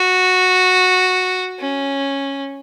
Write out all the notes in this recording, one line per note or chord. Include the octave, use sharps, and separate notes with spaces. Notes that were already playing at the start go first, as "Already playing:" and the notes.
Already playing: F#4
C#4